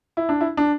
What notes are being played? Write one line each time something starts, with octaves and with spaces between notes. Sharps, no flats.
E4
D4
E4
D4